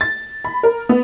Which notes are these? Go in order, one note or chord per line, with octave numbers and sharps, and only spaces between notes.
A6
B5
A#4
B3